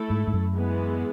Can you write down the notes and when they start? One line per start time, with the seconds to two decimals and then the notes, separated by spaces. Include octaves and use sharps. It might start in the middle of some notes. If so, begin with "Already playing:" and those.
Already playing: A3 E4 A4
0.10 G#2
0.27 G#2
0.33 F#2
0.55 E3 G#3 B3